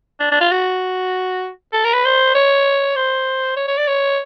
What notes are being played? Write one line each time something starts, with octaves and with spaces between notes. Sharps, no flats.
D4
D4
F4
F#4
A4
A#4
B4
C5
C#5
C5
C#5
C#5
D5
C#5